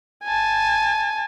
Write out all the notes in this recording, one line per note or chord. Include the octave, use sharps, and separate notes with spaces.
G#5 A5